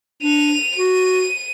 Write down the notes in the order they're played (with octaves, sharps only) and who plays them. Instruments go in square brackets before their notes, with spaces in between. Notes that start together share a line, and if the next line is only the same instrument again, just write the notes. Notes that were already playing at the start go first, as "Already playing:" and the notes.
[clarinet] D4 [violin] D#7 F7
[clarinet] F#4 [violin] D#7